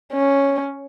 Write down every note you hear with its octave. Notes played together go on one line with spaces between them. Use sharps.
C#4